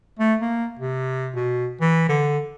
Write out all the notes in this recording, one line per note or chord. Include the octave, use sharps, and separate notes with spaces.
A3
A#3
C3
B2
E3
D3